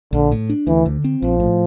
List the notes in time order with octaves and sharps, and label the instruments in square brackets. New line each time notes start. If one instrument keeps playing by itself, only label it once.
[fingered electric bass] A#1 [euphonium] D3
[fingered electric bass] A2
D4
[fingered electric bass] D2 [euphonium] E3
[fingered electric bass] D3
C4
[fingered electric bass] A#1 [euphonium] F3
[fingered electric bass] A2